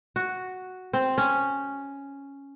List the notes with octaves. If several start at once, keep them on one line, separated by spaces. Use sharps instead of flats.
F#4
C4
C#4